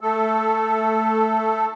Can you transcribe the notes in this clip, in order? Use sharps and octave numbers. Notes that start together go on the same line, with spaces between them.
A3 A4